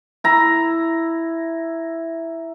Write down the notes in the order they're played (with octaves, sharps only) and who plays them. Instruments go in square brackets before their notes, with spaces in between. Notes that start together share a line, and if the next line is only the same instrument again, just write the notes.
[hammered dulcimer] E4 A#5